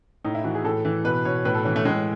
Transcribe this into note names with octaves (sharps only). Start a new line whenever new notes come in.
A2 D#4
E4
E3 F#4
G#4
A2 A4
E3
B2 B4
B2 C#5
A2 B4
A4
E3 C#4
A3
A2 G#3